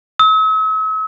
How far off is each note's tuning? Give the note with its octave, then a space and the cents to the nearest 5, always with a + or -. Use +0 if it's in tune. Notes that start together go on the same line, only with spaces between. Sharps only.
E6 -45